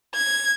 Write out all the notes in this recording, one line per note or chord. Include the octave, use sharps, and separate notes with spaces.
G#6